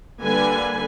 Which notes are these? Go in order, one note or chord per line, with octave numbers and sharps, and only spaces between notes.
D3 G3 A#3 B4 G#5